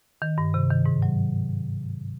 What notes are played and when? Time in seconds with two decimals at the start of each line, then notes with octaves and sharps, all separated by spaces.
0.22 D#3
0.38 G2
0.54 C3
0.70 D#3
0.86 G#2
1.02 F#3